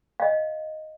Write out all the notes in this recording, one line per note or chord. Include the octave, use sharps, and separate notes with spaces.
D#5 F5